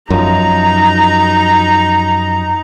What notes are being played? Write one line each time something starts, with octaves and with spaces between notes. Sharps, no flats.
F#2 F3 D#4 A#5